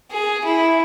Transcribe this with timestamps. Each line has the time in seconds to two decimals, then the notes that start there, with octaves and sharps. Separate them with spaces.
0.11 G#4
0.45 E4